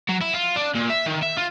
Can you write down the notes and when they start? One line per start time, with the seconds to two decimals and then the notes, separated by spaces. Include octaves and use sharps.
0.09 F#3
0.21 E4
0.34 F4
0.56 D4
0.75 A#2
0.90 E5
1.06 D#3
1.23 E5
1.37 F4